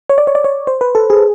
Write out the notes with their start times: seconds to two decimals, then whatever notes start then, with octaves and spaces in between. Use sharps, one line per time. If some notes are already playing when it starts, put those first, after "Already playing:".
0.09 C#5
0.18 D5
0.27 C#5
0.35 D5
0.44 C#5
0.67 C5
0.81 B4
0.95 A4
1.10 G#4